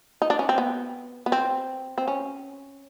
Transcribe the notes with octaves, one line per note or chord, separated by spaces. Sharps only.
D#4
D4
C#4
C4
B3
B3
C4
C4
C#4